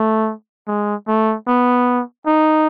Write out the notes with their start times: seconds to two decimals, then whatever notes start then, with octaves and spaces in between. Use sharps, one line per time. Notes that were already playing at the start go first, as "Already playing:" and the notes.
Already playing: A3
0.67 G#3
1.08 A3
1.47 B3
2.27 D#4